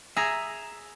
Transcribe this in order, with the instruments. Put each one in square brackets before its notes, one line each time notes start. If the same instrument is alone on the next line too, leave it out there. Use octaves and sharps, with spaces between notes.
[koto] G#4 [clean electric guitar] E5 A#5